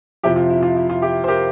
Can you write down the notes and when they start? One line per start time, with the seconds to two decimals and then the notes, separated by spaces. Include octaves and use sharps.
0.23 F2 C3 F3 E4 G4
0.36 F4
0.50 E4
0.63 F4
0.76 E4
0.90 F4
1.02 E4 G4
1.24 C5
1.28 G4 A#4